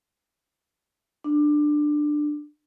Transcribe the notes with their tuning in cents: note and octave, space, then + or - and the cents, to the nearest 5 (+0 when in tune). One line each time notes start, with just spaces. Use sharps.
D4 +15